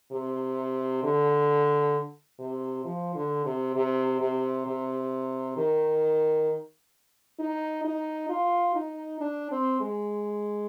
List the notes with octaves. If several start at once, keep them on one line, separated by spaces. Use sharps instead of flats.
C3
D3
C3
F3
D3
C3
C3
C3
C3
D#3
D#4
D#4
F4
D#4
D4
C4
G#3